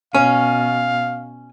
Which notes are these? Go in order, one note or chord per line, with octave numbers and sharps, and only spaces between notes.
B2 C#4 F5